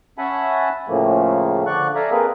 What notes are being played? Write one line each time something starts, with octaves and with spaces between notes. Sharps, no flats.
C#4 E5 F#5 G#5 A5 B5
A2 C#3 F3 A3 A#3
D3 F3 D5 C#6 F#6
A4 D5 E5 F5 G#5 A#5
A#3 C4 G#4 A#4 B4